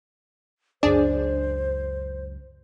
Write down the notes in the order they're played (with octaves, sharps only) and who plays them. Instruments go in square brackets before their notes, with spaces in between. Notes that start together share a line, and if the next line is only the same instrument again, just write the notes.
[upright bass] C#2 F#2 [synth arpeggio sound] D4 G#4 D5 [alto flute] C5